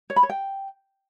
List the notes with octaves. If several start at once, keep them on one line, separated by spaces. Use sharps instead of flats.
C#5
B5
C#5
G5